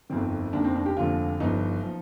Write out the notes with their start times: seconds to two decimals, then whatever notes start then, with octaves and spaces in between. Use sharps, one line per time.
0.10 G1 F2 D#3 C4
0.53 F1 D#2 D#3 D4
0.64 C4
0.76 D4
0.86 G4
0.97 F1 D#2 D3 F3 F4
1.40 G1 G2 F3 D#4
1.83 F3